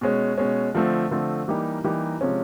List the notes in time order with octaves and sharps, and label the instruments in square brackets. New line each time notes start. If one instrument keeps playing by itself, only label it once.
[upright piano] B2 G#3 C#4
B2 G#3 C#4
D3 F3 A3 C4
D3 F3 A3 C4
E3 G3 A#3 D#4 G4
E3 G3 A#3 D#4 G4
C3 F3 G#3 C#4